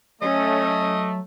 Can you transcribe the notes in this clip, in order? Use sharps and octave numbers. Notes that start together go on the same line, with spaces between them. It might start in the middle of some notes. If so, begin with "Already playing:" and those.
F#3 A3 C#4 D#5